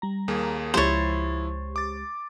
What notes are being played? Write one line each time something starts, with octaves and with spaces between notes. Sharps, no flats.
G3 A#5
D#2 A#3 G#4
C#2 F3 G#3 E4 G4 C5 C#5 A6
D6 A6